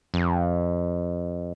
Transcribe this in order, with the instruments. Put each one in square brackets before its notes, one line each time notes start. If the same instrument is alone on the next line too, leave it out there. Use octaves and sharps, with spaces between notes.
[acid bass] F2